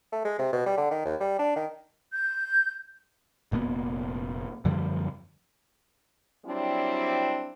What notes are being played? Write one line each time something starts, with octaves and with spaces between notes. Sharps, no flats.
A3
G#3
C3
B2
G3
D3
D#3
D#2
G3
D4
D#3
G6
F1 A#2 A#3 B3
F#2 D3 F3 G3
F#3 G3 C4 D4 E4